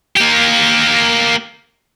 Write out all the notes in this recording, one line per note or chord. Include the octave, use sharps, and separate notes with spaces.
A#3 G4